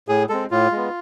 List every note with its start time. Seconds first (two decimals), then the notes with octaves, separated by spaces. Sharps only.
0.08 A2 G#4
0.29 G#3 C4 A4
0.51 A2 F4
0.72 G#3 B3